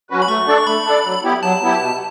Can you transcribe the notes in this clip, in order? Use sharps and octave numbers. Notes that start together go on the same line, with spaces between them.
F#3 C#4 F#4 B4
B5
A3 C#6
D4 A4 D5
C#6
A3 B5
D4 A4 D5
F#3
B3 E4 G4
F#3 A5
B3 E4 G4
B2